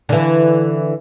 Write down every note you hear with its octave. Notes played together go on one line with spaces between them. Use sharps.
D3 E3